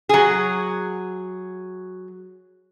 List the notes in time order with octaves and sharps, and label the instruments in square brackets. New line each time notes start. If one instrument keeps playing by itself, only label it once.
[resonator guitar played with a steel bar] F#3 G#4